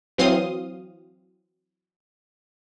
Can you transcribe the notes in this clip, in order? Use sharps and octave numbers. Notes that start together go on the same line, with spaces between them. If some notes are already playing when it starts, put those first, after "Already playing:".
E3 F#3 C4 F5 C6 D#6